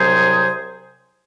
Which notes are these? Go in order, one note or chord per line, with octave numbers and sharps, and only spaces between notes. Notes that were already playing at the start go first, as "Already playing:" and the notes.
Already playing: C2 C3 F#3 G#4 C5